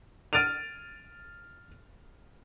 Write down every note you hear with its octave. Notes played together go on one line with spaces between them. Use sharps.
F6 A6 D7 D#7 F7